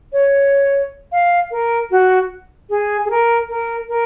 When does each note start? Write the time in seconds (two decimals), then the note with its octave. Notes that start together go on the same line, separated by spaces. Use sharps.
0.13 C#5
1.12 F5
1.51 A#4
1.91 F#4
2.70 G#4
3.05 G#4
3.10 A#4
3.49 A#4
3.89 A#4